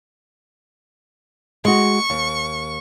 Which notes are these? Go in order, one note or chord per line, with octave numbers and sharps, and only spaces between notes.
G#3 F#4 C#6
D#2